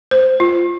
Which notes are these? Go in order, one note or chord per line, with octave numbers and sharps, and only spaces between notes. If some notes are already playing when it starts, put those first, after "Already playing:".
C5
F4